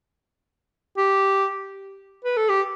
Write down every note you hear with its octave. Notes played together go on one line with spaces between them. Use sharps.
G4
B4
A4
G4